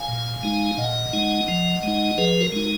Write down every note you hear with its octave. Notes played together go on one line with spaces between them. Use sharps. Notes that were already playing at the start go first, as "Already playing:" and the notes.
Already playing: F5 G#5
A#2
G#3 D#4
A#2 D#5 F#5
G#3 D#4
F3
G#3 D#4
F3 G#4 B4
F#4 A#4
G#3 D#4